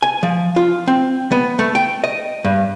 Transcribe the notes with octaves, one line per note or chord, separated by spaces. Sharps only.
G#5
F3
F4
C4
B3
A3
G5
D#5
G2